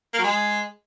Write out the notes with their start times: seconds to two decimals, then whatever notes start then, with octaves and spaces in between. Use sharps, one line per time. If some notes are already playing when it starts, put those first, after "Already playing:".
0.13 A#3
0.19 F#3
0.24 G#3